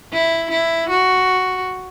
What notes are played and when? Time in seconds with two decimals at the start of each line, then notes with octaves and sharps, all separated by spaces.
0.13 E4
0.51 E4
0.90 F#4